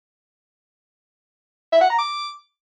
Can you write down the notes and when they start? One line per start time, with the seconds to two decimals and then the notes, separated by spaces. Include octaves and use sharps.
1.72 E5
1.81 F#5
1.90 A#5
1.98 D6